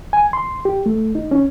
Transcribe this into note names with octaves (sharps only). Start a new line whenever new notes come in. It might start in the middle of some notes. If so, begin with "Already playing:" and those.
G#5
C6
G4
A3
D#4
C#4